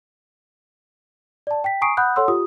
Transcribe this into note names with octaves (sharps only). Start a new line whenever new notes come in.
D5 A5
G5 B6
G#5 A#5 C#6 D#6 C7 D7
F#5 B5 D#6 F#6 G6
A4 C#5 F#5 C6 E6
F4 G4 D#6